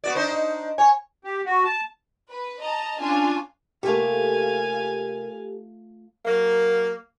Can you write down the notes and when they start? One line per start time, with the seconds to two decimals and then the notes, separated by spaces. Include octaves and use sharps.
0.04 B3 F#4 D5
0.15 D4 D#4 C5
0.32 D#5
0.78 C#5 G#5
1.24 G4
1.45 F#4
1.64 A5
2.29 B4
2.61 D#5 A5 A#5
3.00 C#4 D4 F4 G#5 A5
3.83 C3 A3 A#3 F4 G4 A4 F5 G#5
6.25 F#3 A#3